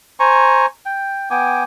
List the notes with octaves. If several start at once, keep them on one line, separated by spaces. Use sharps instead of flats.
C5 G#5 A#5 C#6
G5
B3 G5 G#5 D6